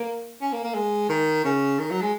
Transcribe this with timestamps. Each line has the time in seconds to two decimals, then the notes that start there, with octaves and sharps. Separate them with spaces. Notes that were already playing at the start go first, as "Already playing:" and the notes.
Already playing: A#3
0.41 C#4
0.52 A#3
0.64 A#3
0.74 G#3
1.09 D#3
1.45 C#3
1.79 D#3
1.91 F#3
2.01 G#3